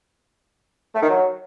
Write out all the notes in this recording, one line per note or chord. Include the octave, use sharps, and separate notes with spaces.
A3
D#3
F#3